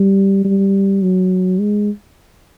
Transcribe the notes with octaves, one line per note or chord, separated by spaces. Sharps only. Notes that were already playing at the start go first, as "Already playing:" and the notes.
Already playing: G3
G3
F#3
G#3